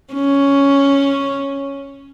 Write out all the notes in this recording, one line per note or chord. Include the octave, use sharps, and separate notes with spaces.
C#4